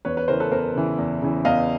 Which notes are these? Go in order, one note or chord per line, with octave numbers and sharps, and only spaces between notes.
E2 B4 C#5
B4 C#5
C#3 E3 A#4 C5
A4 B4
E2 A#4 C5
C#3 E3
E2
C#3 E3
E2 D#5 F5